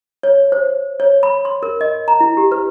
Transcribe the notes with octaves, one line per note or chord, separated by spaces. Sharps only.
C#5
C5
C#5
B5
C6
A#4
D#5
A#5
E4
G4
B4